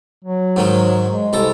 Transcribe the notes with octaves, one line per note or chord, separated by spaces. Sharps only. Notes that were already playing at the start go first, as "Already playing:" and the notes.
F#3
G#2 D#3 G#3
G#3
C2 A4 A#5